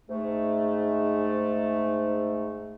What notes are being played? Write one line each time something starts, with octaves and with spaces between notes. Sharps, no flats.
G#2 A3